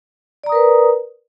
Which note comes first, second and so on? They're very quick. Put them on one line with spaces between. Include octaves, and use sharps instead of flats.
D5 A#5 D#6 A#4 B4